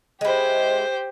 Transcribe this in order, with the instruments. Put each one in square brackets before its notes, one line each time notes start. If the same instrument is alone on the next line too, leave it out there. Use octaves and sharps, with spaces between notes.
[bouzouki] G#3 E4 [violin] G4 C5